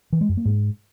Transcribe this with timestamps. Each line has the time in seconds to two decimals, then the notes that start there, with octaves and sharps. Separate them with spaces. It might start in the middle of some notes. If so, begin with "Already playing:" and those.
0.13 E3
0.21 G#3
0.29 F#2
0.37 A#3
0.45 G#2